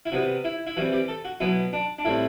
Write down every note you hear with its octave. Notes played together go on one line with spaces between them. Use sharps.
E4
C3 G3 B3 F#4
E4
E4
E3 G3 C4 F#4
G4
A4
F#4
B2 F#3 B3 E4
D4
D4
A2 G3 C4 E4